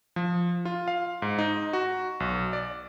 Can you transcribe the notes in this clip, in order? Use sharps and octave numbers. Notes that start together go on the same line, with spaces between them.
F3
F4
F5
G#2
D#4
F#4
B1
D5